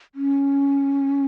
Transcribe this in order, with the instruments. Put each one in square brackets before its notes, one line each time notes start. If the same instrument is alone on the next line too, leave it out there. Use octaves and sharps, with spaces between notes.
[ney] C#4